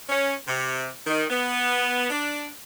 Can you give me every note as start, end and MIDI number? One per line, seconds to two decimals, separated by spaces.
0.09 0.33 61
0.48 0.87 48
1.07 1.24 51
1.30 2.09 59
2.10 2.46 62